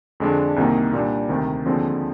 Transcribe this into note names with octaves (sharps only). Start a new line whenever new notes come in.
F2 D3 G#3 D4
C2 C3 D#3 A#3 D#4
A#2 G3 D4
D2 C3 D#3
D#2 D3 F3 G#3 C4